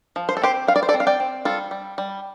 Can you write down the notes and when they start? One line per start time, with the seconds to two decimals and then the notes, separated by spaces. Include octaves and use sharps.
0.16 F3
0.29 C5
0.37 A4
0.42 C4 G4 C5
0.67 G3 F5
0.76 D5
0.83 C5
0.89 A4 D5
0.94 C4
1.00 F5
1.07 D5 G5
1.20 C4
1.45 G3 F4 A4
1.71 G3
1.98 G3